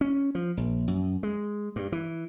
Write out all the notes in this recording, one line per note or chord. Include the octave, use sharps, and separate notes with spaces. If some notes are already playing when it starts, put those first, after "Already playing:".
C#4
F3
A#1
F#2
G#3
G2
E3